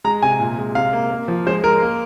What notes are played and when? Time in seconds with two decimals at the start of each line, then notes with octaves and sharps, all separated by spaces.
0.04 G#3 A#5
0.22 C3 G#5
0.40 A#2
0.58 G#3
0.75 C3 F5
0.93 A#3
1.11 A#3
1.28 F3
1.46 G#3 C5
1.64 G#3 A#4
1.82 A#3